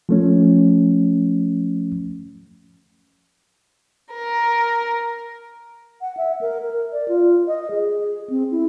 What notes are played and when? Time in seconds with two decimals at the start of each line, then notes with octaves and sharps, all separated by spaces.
0.09 F3 A3 C#4
4.14 A#4
6.01 F#5
6.17 E5
6.41 A#4
6.62 A#4
6.92 D5
7.08 F4
7.47 D#5
7.71 G#4
8.30 C4
8.51 E4